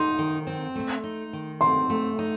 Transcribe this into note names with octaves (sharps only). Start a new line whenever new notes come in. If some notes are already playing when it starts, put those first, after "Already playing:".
Already playing: D#4 C6
D#3
C4
A3
D#4
D#3
C4 C6
A3
D#4